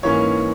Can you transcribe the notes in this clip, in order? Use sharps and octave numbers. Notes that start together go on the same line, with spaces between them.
G#2 E3 A#3 C#4 C#5